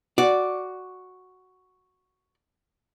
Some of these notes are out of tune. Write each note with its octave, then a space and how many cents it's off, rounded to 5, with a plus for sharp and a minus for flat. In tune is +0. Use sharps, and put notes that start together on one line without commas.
F#4 +0 D5 +0